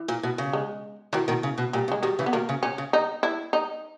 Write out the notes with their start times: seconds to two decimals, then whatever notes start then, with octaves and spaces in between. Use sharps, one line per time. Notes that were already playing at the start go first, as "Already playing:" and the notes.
Already playing: E3
0.08 A#2
0.23 B2
0.38 C#3
0.53 G#3
1.13 B2 D#3 E3
1.28 B2 D#3
1.43 C#3
1.58 B2
1.73 A#2 G3
1.88 C#3
1.92 G#3
2.03 B2 D#3 G3
2.19 C#3 E3
2.26 B3
2.33 B2 D#3 A#3
2.49 C#3
2.63 A#2 C#4
2.78 C#3
2.93 D#4
3.23 E4
3.53 D#4